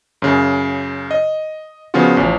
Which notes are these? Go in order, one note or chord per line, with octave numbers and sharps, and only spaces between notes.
F#2 C#3
D#5
C#3 F3 B3 C#4 F4 F#4
A1 F3